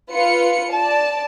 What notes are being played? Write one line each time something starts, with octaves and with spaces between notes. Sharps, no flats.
F4 B4 C#7
D5 A5